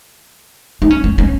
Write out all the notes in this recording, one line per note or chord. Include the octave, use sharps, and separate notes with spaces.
D#4
C#4
C#4
C#4